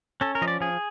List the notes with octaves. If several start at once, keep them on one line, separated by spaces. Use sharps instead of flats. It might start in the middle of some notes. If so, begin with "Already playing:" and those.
C#4 A4
A#4
F3 D#5
D5
F3 G#4